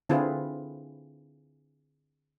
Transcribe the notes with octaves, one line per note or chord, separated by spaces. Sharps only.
D3 C4 E4 F4 G#4 B4